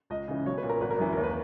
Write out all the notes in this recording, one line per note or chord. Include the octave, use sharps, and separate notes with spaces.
C#2 D#5
C#3 E3
B1 C#5
B4
A#2
A#4
G#1 B4
A#4
F#2 E3 B4
D#2 A#4
B4